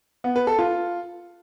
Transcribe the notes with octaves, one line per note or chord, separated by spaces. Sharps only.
B3
B4
A4
F4